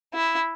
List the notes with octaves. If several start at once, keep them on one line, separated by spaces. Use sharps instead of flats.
E4